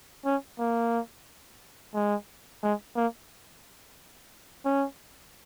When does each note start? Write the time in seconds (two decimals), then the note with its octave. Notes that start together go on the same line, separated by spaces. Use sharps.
0.26 C#4
0.59 A#3
1.95 G#3
2.63 G#3
2.96 A#3
4.65 C#4